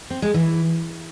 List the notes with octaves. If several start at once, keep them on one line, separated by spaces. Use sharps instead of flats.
C4
G#3
E3